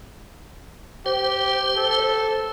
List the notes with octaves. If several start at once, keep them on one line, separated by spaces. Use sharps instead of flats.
G4 C5
A4